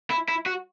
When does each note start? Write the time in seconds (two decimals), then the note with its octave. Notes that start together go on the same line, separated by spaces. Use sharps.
0.10 E4
0.28 E4
0.46 F#4